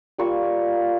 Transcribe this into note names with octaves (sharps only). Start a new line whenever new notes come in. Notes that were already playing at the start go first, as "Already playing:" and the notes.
G3 A#3 F4 C#6